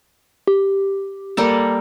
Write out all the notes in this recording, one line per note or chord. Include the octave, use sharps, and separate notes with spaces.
G4
G3 A#3 A4